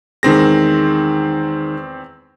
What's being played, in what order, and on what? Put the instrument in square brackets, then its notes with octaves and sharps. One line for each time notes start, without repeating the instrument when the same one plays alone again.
[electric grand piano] E2 C4 A#6 [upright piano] D#3 G#3